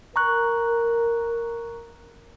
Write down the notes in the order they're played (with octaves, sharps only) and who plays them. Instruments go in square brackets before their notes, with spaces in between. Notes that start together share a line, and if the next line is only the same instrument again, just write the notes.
[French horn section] A#4 [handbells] A#5 C#6 F#6